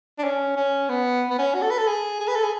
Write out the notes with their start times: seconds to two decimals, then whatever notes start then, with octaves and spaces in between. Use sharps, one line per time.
0.19 D4
0.24 C#4
0.56 C#4
0.89 B3
1.30 B3
1.39 C#4
1.55 F#4
1.62 A4
1.71 B4
1.78 A4
1.88 G#4
2.20 G#4
2.28 B4
2.36 A4
2.44 G#4